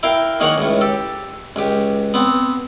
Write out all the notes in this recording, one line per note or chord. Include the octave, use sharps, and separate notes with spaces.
E4 A#4 F5 G5
D#3 A#3 G#4 A#4 C#5 F#5
C#2 A2
G4 A4
C#2 G4
B3 C4